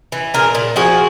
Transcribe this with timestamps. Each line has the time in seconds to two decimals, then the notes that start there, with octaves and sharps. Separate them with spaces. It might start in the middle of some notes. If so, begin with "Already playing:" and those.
0.12 E3
0.34 A#2 G#4 A#4
0.55 A#2
0.76 F3 F#4 G#4